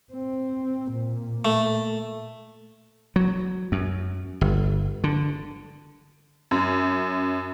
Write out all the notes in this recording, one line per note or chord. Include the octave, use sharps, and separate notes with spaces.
C4
A#2
A3
F#3
F#2
G1
D3
F#2